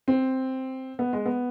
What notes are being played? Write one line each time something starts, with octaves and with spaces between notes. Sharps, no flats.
C4
B3
G#3
B3